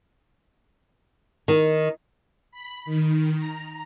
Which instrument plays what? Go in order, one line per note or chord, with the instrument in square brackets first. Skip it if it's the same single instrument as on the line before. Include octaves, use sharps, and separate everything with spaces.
[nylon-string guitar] D#3
[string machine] B5
D#3
A#5